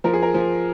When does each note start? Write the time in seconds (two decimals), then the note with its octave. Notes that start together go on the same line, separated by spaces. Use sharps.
0.04 F3 A#4
0.14 G#4
0.23 A#4
0.34 F3